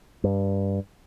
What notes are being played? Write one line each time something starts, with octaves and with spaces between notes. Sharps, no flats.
G2